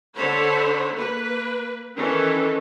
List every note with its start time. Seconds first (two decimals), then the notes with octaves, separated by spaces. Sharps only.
0.16 D3 A4 C5 C#5 B5
0.94 A#3 B4
1.96 D#3 E3 C#4 A4